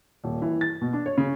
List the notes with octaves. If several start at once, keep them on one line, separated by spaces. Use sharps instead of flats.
D#1
E3
A6
B2
D4
C#5
C#3